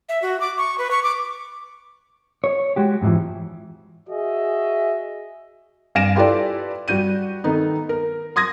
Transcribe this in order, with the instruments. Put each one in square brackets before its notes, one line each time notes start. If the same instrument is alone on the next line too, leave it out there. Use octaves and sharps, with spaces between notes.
[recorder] E5
F#4
D6
C#6
B4
C#6
D6
[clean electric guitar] C#5
G#3 F#4 G4
F2 G#2 B2 E3 F3
[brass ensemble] F#4 G#4 D#5 E5
[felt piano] G2 F5 G#5 A#6 D7 E7
E4 F4 G4 A4 B4 D5
G3 F#4 G6 D#7
D#3 A3 B3 D#4
A#4
C6 D#6 G#6 A#6